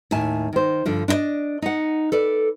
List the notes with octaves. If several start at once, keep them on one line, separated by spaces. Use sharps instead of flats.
D#2 A2 E5 G#5 A5
D#3 C5
G2 D3 F3 D4
D4 E4 A4 D5 D#5
D#4 F#5
A4 B4 D5